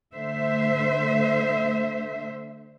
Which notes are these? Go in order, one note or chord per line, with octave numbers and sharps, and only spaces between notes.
D3 A3 C5 E5